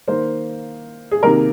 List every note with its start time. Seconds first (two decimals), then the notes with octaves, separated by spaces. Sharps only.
0.08 D#3 A#3 C5
1.11 G#4
1.23 C3 D#3 A#3 A#4